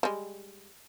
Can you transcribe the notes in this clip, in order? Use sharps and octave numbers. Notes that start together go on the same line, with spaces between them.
G3 G#3